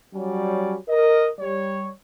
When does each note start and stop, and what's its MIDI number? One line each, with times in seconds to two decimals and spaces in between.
0.14 0.76 54
0.14 0.76 55
0.14 0.76 61
0.14 0.76 74
0.88 1.29 70
0.88 1.29 75
1.40 1.91 55
1.40 1.91 73